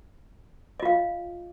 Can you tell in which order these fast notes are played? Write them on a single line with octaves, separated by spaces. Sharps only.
D#5 F4 F5